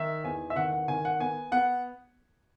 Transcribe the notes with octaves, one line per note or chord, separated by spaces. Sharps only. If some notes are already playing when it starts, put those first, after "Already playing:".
Already playing: D#3 D#4 E5
E2 G#5
E5
D#3 F#5
F#5
D#3 G#5
F#5
B3 G#5
B3 F#5